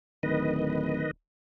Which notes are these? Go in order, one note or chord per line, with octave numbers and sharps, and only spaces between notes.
D1 D#3 B4 D#5